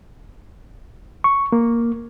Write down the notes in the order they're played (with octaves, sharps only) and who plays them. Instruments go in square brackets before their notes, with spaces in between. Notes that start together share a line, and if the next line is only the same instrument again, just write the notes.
[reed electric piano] C#6
A#3